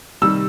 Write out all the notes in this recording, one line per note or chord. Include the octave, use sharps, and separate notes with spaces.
C3 D#3 G3 E6